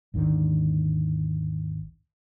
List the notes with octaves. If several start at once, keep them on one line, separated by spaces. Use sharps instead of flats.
G#1 D#2 D3 D#3